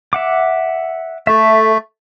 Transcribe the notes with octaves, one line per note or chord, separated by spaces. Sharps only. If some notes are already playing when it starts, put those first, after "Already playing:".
E5 F#5 D6
A3 A4 E5